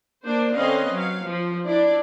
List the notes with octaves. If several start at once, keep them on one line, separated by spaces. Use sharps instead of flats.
A#3 D4 C5
D3 C4 C#4 B4 D#5 F5
F#3 F5
F3
D4 E4 D5